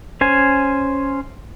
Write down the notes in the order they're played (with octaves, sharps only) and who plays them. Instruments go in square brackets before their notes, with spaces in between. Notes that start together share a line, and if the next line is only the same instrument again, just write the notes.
[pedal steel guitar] C#4 C5 G#5